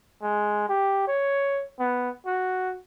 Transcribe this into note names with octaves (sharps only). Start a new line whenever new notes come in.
G#3
G4
C#5
B3
F#4